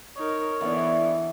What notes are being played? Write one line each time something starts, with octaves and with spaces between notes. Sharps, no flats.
D#4 A#4 C#5
D3 E3 B3 E4 D5